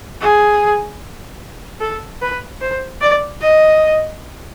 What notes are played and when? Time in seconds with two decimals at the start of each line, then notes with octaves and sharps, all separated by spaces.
0.21 G#4
1.81 A4
2.21 B4
2.61 C5
3.01 D5
3.42 D#5